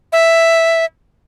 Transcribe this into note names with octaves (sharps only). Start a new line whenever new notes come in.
E5